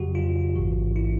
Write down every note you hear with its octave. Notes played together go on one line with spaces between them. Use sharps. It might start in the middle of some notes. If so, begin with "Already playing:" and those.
Already playing: F2 C#3 F#3 F#4 G4
F4
A1 G#2 E3
E4